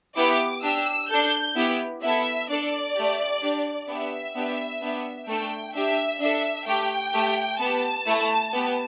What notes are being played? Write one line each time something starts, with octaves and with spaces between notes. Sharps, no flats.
B3 E4 G4 D6
D4 G4 E6
D4 A4 G6
B3 E4 G4
B3 E4 A4 E5
D4 A4 D5
A3 G4
D4 G4
B3 D4 G4 E5
B3 D4 G4
B3 D4 G4
A3 D4 A4 G5
D4 G4 E5
D4 A4 E5
A3 G4 G5
A3 G4
B3 G4 A5
A3 E4 A4
B3 G4